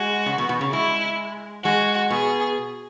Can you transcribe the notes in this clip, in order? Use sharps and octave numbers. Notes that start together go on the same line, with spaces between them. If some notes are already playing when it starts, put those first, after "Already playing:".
Already playing: G#3 F#4
C#3
B2
B2
C#3
G#3 E4
G#3 F#4
B2 G#4